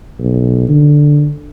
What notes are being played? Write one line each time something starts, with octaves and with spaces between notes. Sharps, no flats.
B1
D3